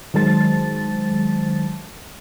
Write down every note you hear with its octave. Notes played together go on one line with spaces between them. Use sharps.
D#3 F#3 G#3 C5 A5 A6